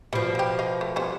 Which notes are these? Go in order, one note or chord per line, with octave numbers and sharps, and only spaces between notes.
B2 F3 G3
F#3 G4
D#5 F5
A3
G3 B3 C5